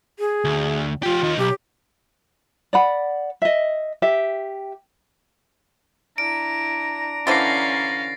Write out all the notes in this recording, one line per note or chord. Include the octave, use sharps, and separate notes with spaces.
G#4
D2
F3 F4 G4
D#2 D#4
B1 G4
D5 F#5 B5
D#5 E5
G4 E5 G5
D4 E4 A#5 D7
D3 E3 C#4 C5 F5 A6 A#6 C7